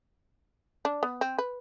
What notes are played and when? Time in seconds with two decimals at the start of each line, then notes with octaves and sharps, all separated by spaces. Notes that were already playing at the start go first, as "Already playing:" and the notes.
0.85 D4
1.03 B3
1.21 C4
1.38 B4